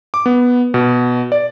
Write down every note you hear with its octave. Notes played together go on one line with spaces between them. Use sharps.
D6
B3
B2
D5